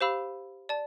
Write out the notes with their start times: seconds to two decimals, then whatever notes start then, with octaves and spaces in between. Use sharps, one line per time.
0.01 G4 C5 F5 B5 E6
0.69 D5 A5